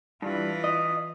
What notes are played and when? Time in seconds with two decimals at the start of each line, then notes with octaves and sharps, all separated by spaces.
0.22 G2 E3 F4
0.64 D#5